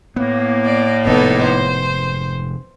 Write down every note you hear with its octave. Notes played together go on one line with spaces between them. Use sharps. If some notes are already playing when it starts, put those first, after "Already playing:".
A2 A#3 B3
D5
F1 G#2 B3 D#4 A4
C5